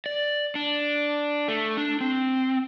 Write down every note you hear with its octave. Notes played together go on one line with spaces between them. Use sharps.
D5
D4
A3
D4
C4